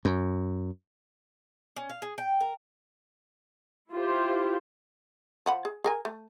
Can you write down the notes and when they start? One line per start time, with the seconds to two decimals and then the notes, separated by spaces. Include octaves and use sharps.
0.05 F#2
1.76 C#4
1.89 F5
2.02 G#4
2.18 G5
2.41 A#4
3.92 E4 F4 G4 C5
5.46 F3 F#5 B5
5.65 G#4
5.84 G#4 A#4 G#5
6.05 A3